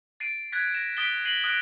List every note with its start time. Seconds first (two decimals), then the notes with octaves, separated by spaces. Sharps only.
0.20 A6 C7 D7 D#7
0.52 F#6 G#6 A6 B6
0.75 A#6 E7
0.97 D#6 A6 B6 D7 E7 G7
1.25 A#6 C7 D#7 F#7
1.44 D#6 F#6 A#6 D7